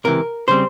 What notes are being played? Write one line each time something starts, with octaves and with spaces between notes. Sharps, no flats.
C#2 C3 E3 A#4
C#3 G3 C4 C5